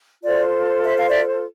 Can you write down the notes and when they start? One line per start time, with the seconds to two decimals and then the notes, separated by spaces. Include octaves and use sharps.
0.23 F4 A4 C5 D5
0.84 E5
0.96 F5
1.09 D5 E5